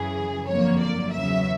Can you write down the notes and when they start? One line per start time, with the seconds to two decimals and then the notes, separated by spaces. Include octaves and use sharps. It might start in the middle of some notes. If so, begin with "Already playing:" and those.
Already playing: F#2 C#3 E3 G#4
0.49 G1 F2 D3 F#3 A#3 C#5
0.82 D5
1.14 E2 C#3 F#3 E5